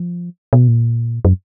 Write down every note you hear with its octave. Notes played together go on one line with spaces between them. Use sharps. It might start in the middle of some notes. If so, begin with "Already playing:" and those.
Already playing: F3
B2
A#2
F#2